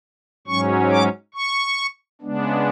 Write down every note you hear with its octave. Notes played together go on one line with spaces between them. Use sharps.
G#2 F#3 C#4 C#6
D6
C#6
C#3 G#3 B3 D4